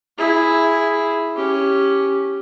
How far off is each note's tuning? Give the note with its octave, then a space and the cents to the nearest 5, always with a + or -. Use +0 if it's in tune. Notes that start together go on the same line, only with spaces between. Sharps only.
E4 +0 G#4 +0
C#4 +0 G4 +0